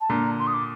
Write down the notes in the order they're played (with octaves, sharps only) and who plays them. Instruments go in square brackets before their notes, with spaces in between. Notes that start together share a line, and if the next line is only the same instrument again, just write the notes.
[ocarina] A5
[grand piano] A#2 D3 [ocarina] A#5
[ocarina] C6
D#6
D6